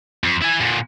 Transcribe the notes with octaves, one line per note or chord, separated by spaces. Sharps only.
F2
E4 G#5
A#2 D3